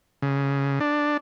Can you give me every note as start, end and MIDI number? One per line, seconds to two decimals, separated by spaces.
0.22 0.79 49
0.80 1.17 62